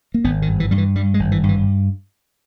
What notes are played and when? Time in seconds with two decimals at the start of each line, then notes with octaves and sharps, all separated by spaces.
0.14 A#3
0.24 G#1 B3
0.42 D#3
0.48 G2
0.60 E3
0.71 G2 G3
0.78 E3
0.95 G2 G3
1.14 G#3
1.19 G#1
1.32 E3
1.43 G2
1.49 E3